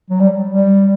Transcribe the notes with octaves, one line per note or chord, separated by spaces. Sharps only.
F#3
G3
G3